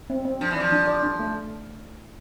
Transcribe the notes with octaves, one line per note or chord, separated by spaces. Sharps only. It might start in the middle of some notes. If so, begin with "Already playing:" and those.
C4
C4
F3 D4
E3
F3 D5
D4
D5
D4
A3